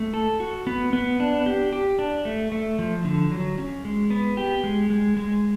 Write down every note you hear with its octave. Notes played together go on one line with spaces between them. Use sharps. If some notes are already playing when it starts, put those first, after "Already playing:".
Already playing: A3
A4
F#4
B3
B3
D4
G4
G4
D4
A3
A3
F3
D3
F#3
C#4
G#3
B3
G4
G#3
G#3
G#3